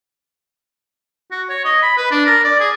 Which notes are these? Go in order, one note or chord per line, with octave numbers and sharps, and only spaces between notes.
F#4
C#5
D#5
B5
B4
D4
A#4
D5
G#4